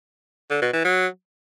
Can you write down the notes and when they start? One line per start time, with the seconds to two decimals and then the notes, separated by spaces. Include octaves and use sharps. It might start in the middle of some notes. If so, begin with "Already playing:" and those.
0.50 D3
0.62 B2
0.73 E3
0.85 F#3